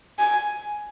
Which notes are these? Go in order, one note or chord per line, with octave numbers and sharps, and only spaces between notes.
G#5